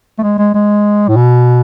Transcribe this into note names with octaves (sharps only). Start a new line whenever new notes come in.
A3
G#3
G#3
G#3
A2
B2